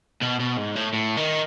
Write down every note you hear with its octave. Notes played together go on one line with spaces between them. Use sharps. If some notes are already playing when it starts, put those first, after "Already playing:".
B2
B2
G#2
A2
A2
D#3